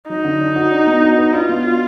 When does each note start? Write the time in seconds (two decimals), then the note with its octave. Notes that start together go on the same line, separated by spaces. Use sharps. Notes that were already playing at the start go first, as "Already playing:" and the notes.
0.09 F#3 D#4
0.24 D3
0.40 D4
0.56 F#4
0.71 D4
0.87 B3
1.03 F#4
1.18 B4
1.33 D4 F4
1.49 B3
1.65 F#4